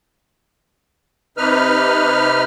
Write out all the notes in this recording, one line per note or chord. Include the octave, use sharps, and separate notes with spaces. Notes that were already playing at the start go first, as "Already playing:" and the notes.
C3 D#4 B4 F6